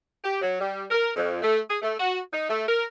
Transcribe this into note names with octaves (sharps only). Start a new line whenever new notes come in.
G4
F#3
G3
A#4
F2
A3
G#4
A3
F#4
D#4
A3
A#4